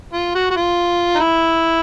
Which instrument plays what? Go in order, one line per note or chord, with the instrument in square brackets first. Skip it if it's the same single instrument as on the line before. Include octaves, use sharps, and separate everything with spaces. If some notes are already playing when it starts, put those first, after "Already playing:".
[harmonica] F4
F#4
F#4
F4
D#4
E4